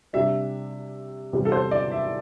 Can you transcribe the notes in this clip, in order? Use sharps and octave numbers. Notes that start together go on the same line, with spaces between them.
C3 G3 D4 E5
E2 C3 G3
A4
C5
D5
E5